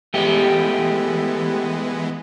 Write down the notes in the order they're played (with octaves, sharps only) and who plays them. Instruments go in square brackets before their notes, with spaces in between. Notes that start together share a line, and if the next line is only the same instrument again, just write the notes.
[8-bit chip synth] E3 G#3 B3 [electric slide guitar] A3 G4